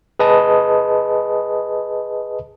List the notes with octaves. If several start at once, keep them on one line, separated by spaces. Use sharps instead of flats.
G#4 B4 D#5 A5 D#6